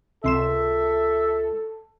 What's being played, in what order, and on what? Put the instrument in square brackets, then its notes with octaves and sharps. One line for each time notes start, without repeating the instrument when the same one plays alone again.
[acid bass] C#2 [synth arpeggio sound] C3 C6 E7 [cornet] A4 [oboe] E5